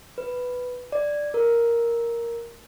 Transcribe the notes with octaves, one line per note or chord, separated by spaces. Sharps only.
B4
D5
A#4